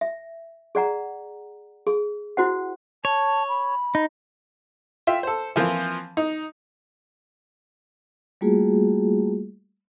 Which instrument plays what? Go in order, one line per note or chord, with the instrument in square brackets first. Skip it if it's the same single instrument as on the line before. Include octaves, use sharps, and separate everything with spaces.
[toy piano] E5
G#4 D5 F#5 A#5
G#4
E4 F#4 C5 F#5
[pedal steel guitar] C#5 [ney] A5
[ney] B5
[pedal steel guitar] D#4
[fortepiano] F4 E5 G5
A4 C5
E3 F3 A#3 C4 F4
D#4
[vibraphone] G3 A3 A#3 F4 F#4 G#4